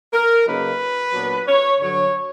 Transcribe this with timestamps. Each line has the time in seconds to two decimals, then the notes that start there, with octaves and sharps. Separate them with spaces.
0.14 A#4
0.47 C#3 F#3 A#3 D#4 B4
1.13 A#2 F#3 B3 D4
1.47 C#5
1.80 G2 D3 F#3 C#5